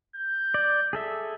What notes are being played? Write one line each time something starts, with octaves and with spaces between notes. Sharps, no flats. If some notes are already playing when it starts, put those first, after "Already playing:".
G6
D5
G#4 A4 E5